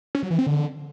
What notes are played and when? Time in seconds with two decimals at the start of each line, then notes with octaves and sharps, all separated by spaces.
0.15 C#4
0.23 F#3
0.31 E3
0.39 C4
0.47 D3